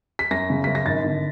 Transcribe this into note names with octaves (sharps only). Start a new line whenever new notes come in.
B6
F#2 A#6
C#3
F#2 B6
A#6
G#1 A6
D3